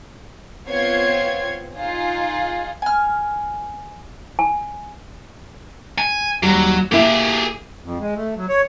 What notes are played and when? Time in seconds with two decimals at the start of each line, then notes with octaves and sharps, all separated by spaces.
0.67 B3 C4 F4 C#5 G#6 C7
1.76 D#4 F4 G#4
2.82 G#5 F6
4.39 G#5
5.98 G#5
6.43 D#2 F#3 G3
6.92 A#3 E4 G4 G#4
7.84 F2
8.00 G#3
8.16 A3
8.36 F#3
8.49 C#5